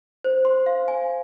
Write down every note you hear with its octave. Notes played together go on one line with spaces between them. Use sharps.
C5
C6
F5
G#5